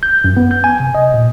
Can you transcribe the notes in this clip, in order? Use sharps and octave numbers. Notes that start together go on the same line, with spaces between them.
G6
F#2
B3
G6
G#5
C3
D#5
A#2